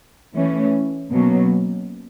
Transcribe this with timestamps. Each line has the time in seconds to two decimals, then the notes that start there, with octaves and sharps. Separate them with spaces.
0.34 E3 A3 C#4
1.10 B2 F#3 A#3 C#4